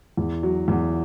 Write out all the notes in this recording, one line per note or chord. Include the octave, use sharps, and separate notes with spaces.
E2
F#3
E2